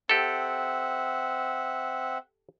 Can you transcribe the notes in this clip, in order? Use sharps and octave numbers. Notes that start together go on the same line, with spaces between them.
C4 G4 A4 E5 F#5